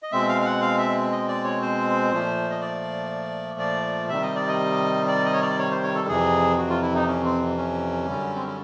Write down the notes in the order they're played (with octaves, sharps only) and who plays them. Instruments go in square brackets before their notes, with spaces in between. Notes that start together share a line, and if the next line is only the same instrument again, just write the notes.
[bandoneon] D#5
B2 G#3 C4 E5
F5
F5
F#5
F5
E5
D#5
D5
C#5
C5
A#2 F3 A3
D#5
D5
D5
C3 D#3 G3 E5
D#5
D5
D#5
D5
D#5
C#5
D5
C#5
C5
C#5
A4
F2 C3 E3 G#4
F#4
F4
E4
D#4
C#4
C4
C#4
F#2 D3 G3
C4
C#4